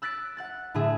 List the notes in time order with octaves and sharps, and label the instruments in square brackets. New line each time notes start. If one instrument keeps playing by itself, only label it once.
[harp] E6 F#6 A6 B6 D7
F#5 F#6 A6
A2 D3 A3 G#4 E5